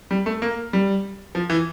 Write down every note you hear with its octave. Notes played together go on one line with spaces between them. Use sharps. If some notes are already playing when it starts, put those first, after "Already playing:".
G3
A3
A#3
G3
F3
E3